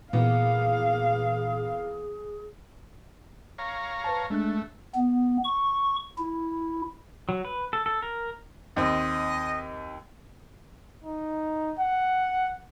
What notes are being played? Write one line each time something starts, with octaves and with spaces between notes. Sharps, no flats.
A#2 E3 A#3 B3 G#4 F5
C#5 F5 A#5
B4 C5 A5
G#3 A3 D4 F#6
B3
C#6
E4
F#3
B4
A4
A4
A#4
D#2 C4 D#5
D#4
F#5